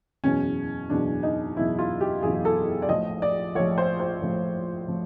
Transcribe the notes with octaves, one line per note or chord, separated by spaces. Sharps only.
F#1 E2 B2 C#4
F#1 E2 B2 D4
D#4
F#1 E2 B2 E4
F4
G4
F#1 E2 B2 G#4
A4
D5
A#1 A2 F3 D#5
D5
A#1 A2 F3 C#5
C5
C5
A#1 A2 F3
A2 F3